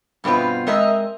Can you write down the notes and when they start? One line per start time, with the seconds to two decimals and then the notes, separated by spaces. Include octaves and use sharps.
0.24 G2 B2 B3 C4 F4
0.67 G#3 C4 A#4 D#5 E5